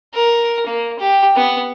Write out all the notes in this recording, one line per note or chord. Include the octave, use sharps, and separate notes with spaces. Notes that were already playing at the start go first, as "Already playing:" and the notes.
A#4
A#3
G4
B3